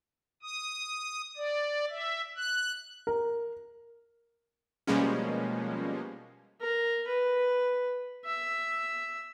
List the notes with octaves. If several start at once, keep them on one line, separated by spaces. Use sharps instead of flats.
D#6
D5
E5
F#6
A#4
B2 F3 G3 G#3 A#3 C#4
A#4
B4
E5